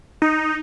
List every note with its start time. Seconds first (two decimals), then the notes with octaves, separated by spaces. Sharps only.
0.22 D#4